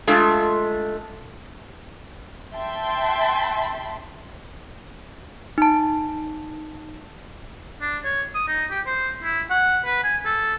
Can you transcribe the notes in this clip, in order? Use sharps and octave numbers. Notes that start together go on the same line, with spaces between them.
G#3 A3 D4 F4 A4
E5 G5 A5 C6
D#4 A5
D4
C#5
D#6
D#4
G4
C5
E4
F#5
B4
G#5
A4